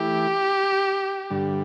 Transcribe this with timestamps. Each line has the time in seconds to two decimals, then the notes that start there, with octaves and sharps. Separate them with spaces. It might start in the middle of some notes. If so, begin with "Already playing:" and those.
Already playing: E3 A3 E4 G4
1.30 G2 D3 G3